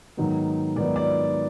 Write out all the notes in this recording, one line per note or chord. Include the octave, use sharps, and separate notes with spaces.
G#2 D#3 F#3 B3 D#4
G#2 D#3 F#3 B3 D#4 D5
D5